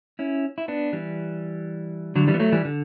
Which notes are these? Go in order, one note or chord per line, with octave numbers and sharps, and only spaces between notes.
C#4 E4
E4
B3 D4
E3 G3
D3 F#3
E3 G3
B3
F#3 A3
E3 G3
D3